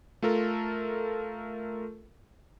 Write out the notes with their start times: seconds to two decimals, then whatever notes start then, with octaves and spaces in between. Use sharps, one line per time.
0.22 A3 F4 A4 A#4